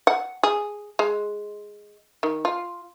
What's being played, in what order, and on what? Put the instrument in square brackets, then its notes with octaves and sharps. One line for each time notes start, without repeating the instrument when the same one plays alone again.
[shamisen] F#5
G#4
G#3
D#3
F4